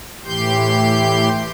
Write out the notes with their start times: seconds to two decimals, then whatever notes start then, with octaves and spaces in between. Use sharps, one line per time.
0.25 A2 E3 G4 C6 G6